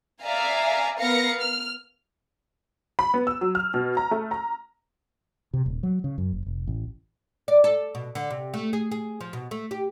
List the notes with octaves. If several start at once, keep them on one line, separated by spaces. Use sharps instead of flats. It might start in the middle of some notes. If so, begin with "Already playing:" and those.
D5 E5 F5 G#5 A#5
B3 A#4 F5 A#6 C#7
F6
B5
B3
E6
F#3
F6
B2
A#5
A3
A#5
C3
D#1
F#3
C#3
F#2
F#1
F1
A1
D5
A4
B2
D3
C3
A3
G#4
G#4
F3
B2
A3
G4